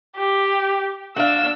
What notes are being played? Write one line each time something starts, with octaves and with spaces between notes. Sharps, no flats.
G4
D4 F#4 F5 E6